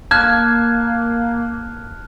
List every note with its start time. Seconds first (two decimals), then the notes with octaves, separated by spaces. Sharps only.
0.11 A#3 A5 F6 F#6 G#6